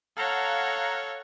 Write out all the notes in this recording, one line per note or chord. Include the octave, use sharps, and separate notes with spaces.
A4 C#5 F5 F#5 A#5